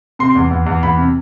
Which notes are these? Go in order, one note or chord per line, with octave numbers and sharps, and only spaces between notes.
C3 C6
E2
E2
E2
E2 B5
C3